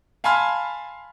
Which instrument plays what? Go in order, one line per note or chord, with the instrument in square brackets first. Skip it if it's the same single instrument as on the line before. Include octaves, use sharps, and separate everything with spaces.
[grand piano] F5 G#5 A5 B5 C6 F6